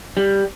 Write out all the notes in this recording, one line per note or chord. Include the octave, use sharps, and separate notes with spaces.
G3